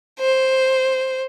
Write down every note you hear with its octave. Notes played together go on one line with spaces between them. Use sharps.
C5